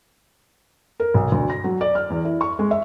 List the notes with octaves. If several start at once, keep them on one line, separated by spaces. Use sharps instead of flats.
A#4
B1
D2
A#6
F#3
D5
F6
E2
E4
C#6
G#3
E5